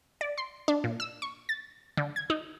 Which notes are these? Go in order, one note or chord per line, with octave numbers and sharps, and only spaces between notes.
D5
C6
D4
A#2
E6
C#6
A6
D3
G#6
D#4